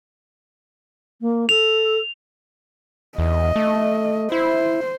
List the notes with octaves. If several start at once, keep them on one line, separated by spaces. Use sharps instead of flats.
A#3
A4 F7
E2 D#5
A3
E4 C5